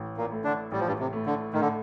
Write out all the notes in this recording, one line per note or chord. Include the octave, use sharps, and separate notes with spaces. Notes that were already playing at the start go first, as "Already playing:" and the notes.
Already playing: A1
A#2 A#3
A2 A3
D3 D4
A1 G3
F3
G2 G3
C3
A2 A3
D3
A2 D#3
D3